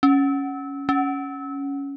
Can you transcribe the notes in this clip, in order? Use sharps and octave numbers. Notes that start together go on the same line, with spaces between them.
C#4
C#4